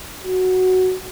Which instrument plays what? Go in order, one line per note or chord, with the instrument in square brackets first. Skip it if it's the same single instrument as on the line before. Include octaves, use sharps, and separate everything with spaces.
[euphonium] F#4